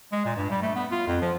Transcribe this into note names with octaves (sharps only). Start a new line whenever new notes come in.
G#3
A#2
G2
G3
A3
B3
F4
F2
F3